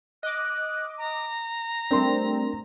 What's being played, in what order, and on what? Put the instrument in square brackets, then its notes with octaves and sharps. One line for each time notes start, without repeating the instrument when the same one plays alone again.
[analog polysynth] D#5 D6 [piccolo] F#6
[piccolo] A#5
[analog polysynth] G3 A3 C4 [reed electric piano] D4 A#4 C6